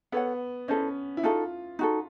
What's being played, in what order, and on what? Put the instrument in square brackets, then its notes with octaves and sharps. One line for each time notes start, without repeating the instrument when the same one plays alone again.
[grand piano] B3 [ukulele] A4 C#5 F#5
[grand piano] C#4 [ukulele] E4 A4 C5 D#5
[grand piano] E4
[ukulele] D#4 F#4 A4 [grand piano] F4
[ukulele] D#4 F#4 A4